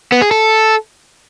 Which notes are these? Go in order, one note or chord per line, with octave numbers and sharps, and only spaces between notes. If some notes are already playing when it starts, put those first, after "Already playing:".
B3
G#4
A4